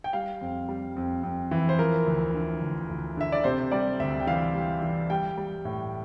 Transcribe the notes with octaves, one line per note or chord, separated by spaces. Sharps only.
G5
G3 F5
F2
G3
F2
F2
E3
C5
F3 A#4
D2
D3
D2
D2
D3 E5
D5
C3 C5
G3 D5
D2 E5
G5
E3 F5
G3
E3
G3 G5
G3
A2